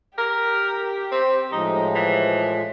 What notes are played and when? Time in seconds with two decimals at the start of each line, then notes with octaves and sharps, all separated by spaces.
0.18 G4 A#4
1.12 C4
1.52 A2 F3 G#3 D#4
1.95 E3